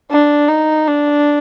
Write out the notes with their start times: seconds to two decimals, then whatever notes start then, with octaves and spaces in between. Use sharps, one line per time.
0.11 D4
0.49 D#4
0.87 D4